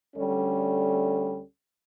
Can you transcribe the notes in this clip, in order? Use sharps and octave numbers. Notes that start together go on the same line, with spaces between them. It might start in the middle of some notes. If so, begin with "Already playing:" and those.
D2 G3 C#4 A4